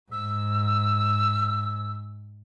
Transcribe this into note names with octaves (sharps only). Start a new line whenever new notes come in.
G#2 E6